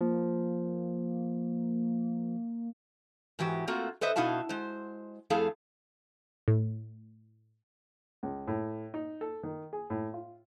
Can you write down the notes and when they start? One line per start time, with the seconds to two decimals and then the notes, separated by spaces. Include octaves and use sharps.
0.01 F3 A#3
3.39 G#2 E3 F#4 G4
3.67 A3 A#3 C4 F4 F#4
4.01 A4 B4 C5 D#5 E5
4.16 B2 D#4 E4 F#4 F5 A5
4.49 G#3 C5
5.30 F2 A3 E4 G#4 A4 F5
6.48 A2
8.23 C#2
8.47 A2
8.94 D#4
9.21 A4
9.43 D#3
9.73 G#4
9.90 A2
10.14 F4